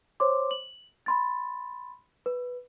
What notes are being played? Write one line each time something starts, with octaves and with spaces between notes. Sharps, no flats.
C5 C#5 C6 D6
F#7
B5 C6 A6
B4